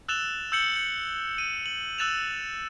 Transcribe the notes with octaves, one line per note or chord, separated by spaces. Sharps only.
E6 F#6 A6 E7 F7 G7
E6 G6 C#7 F#7 G7
G6 C#7
D#7
F#7
E6 F#6 A6 E7 F7